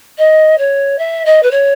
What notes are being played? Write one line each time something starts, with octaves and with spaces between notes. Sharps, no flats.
D#5
C#5
E5
D#5
B4
C#5